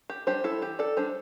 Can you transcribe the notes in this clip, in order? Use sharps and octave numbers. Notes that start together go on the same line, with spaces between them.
G4
G3 D4 G4 C5
E4 A4
E3 G4
A4 D5
G3 D4 G4 C5